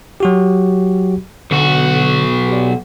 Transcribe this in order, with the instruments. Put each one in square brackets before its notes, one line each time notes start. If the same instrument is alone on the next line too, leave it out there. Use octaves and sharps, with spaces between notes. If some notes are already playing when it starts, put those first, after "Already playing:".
[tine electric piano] F#3 F#4 G4
[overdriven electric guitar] B1 F#4 [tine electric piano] D3
[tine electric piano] G4 D5